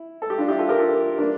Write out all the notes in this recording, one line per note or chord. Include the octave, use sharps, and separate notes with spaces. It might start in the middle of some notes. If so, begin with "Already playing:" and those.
Already playing: E4
A4
G4
D4 F4
E4 G4
F4 A4
G4 A#4
F4 A4
A#3 D4